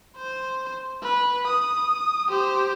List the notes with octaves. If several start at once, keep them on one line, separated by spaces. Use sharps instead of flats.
C5
B4
D#6
G4 C5